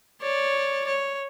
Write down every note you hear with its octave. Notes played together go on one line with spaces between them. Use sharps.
C#5 D5
C#5